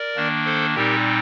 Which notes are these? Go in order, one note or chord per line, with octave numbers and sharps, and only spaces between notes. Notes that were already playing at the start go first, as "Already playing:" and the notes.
Already playing: A#4 D5
D#3 A#3 D4
A4 C5
A#2 G3 C4 D#4 G4 A#4